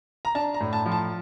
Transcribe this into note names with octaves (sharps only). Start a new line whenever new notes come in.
A#5
D4 A5
A#5
A2
A5
F3
A5